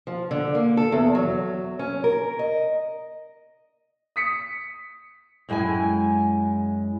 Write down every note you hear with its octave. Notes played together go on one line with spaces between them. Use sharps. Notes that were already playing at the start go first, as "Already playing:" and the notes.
F3
D3
A#3
A4
E2
F#3
C#4
A#4
D#5
D#6 B6 C#7
F#2 G#3 E4 G5 G#5